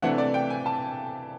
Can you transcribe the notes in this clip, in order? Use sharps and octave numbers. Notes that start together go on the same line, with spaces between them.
C3 E3 A3 D4 F#5
D5
G5
G#5
A5